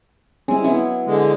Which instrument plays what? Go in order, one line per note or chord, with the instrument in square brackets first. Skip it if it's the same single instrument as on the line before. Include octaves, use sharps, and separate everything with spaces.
[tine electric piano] G3 C4 C#4 [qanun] G#3 E4
[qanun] F#3 B3 E4 [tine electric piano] E5
[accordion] D3 G#3